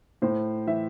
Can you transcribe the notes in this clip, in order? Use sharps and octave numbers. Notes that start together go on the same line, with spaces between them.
A2 C5
E3 E5